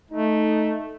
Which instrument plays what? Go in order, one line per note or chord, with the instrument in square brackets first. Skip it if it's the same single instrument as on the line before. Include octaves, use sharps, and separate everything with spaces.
[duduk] A3 [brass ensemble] D#4